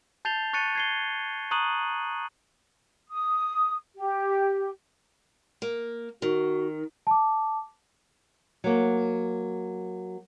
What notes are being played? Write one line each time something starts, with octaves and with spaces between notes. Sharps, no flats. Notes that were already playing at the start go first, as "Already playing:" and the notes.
A5 G6 A6 C7 F7 G7
C#6 F#6 A6 C#7 D#7
G#6 C7 G7
A#5 C#6 D#6 F#6 D#7 F#7
D#6
G4
A#3
D#3 F#4
A5 D6
F#3 A#3